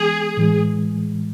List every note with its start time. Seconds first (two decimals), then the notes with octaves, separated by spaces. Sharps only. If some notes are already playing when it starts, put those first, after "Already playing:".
Already playing: E3 G#3 B3 G#4
0.37 A2 E3 G#3